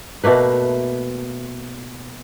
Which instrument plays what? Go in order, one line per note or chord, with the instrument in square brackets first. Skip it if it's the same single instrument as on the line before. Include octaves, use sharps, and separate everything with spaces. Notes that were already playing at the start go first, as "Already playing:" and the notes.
[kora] B2 A3 A#3 B4